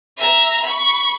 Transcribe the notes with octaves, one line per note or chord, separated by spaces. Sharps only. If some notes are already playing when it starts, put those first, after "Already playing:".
E5 A#5
B5 C#6